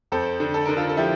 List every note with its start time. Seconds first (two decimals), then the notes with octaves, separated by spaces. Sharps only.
0.12 F2 A4 C5
0.40 D3
0.54 A4
0.66 D3 A#4
0.77 F4 A4
0.89 A4
0.97 F3 E4 G4